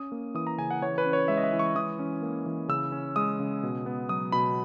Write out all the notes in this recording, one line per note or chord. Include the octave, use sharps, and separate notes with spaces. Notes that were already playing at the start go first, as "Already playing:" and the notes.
Already playing: C#4 D#6
A#3
E3 D#6
A#5
C#3 G#5
F#5
E3 C#5
B4
C#4
C#5
G#3 E5
D#5
E5
E3
C#6
E3 D#6
C#4
A#3
E3
C#3 E6
C#4
G#3 D#6
C#3
B2
B3
F#3 D#6
B2 B5